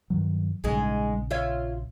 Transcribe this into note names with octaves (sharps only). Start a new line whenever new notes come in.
G2 D#3 F#3
A#1 G#2 C#3 G#3
F4 C#5 E5